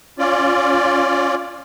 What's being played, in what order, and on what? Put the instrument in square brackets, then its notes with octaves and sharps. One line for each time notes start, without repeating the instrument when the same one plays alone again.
[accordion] C#4 F4 D5